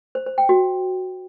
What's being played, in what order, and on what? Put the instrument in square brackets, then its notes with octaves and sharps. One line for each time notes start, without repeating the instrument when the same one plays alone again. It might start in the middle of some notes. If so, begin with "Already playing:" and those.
[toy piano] C5
C5
G5
F#4